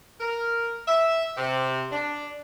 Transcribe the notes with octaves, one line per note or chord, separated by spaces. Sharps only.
A#4
E5
C3
D4